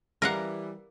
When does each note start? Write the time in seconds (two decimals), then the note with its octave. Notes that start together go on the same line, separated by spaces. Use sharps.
0.22 E3 G3 A#4 F5 F#5